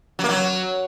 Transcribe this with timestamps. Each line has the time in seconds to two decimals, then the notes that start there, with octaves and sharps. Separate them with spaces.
0.19 F#3
0.24 A#3
0.29 F#3